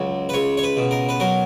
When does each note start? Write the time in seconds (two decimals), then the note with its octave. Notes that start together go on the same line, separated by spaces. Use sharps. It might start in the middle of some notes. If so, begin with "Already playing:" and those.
Already playing: C#2 F#3
0.29 B4
0.34 C#2 C#5
0.57 C#5
0.63 B4
0.77 B2
0.91 A#4
1.09 B4
1.20 F#3 A#4